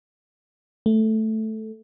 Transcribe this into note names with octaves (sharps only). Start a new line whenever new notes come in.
A3